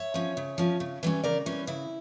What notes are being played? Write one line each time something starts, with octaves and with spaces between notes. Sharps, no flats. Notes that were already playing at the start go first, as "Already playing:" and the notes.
Already playing: C#5 E5
F3 C#4
C#3
F3 C#4
C#3
E3 G3 C#4
C#3 A#4 D5
E3 G3 C#4
C#3 E4